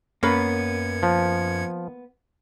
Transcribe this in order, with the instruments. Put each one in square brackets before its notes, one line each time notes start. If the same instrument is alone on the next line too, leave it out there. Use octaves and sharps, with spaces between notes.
[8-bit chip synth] F#2 G#6 C#7 [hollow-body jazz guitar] A#3 B3 [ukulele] C#4 B4
[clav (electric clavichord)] F3